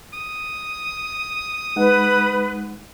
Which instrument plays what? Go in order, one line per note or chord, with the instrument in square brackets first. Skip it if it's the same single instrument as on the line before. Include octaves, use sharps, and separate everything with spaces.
[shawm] D#6
[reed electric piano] G#3 D#4 F#5 [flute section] B4